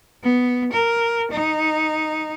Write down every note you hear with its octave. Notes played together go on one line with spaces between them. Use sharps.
B3
A#4
D#4